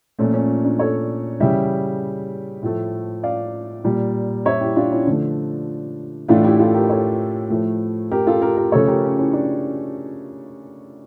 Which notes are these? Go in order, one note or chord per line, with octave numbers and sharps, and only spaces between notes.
A#2 F3 A3 C#4
C#4
D4
A4 C#5
C#3 E3 G3 E5 G5
A2 F3 A3
D5 F5
A#2 G3
C#5 E5
E4 G4
D4 F4
C#4 E4
D3 F3 A3 D4
A2 E3 A3 D4 F4
E4 G4
F4 A4
G4 A#4
A4 C#5
A2 F3 A3
G4 A#4
F4 A4
G4 A#4
G4 A#4
C#3 F3 A3 A4 C#5
G4 A#4
C#4
C#4 E4
D4